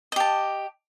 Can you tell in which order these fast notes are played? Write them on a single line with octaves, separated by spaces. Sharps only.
D#5 G4 A5